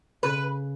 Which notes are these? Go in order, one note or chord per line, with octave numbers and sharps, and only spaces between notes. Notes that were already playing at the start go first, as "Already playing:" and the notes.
C#3 B4